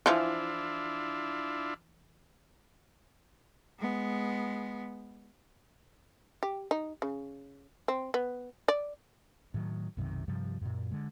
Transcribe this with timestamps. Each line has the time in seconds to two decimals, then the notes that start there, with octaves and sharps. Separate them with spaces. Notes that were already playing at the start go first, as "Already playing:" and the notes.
0.06 E3 F3 D4 E4 F4
3.79 G#3 B3
6.43 G4
6.71 D#4
7.02 C#3
7.88 C4
8.14 B3
8.68 D5
9.54 A2 D#3 F3 F#3
9.97 B1 F#2 C3 D#3
10.28 G2 C3 F3 G3
10.61 F#2 A#2
10.92 D3 G#3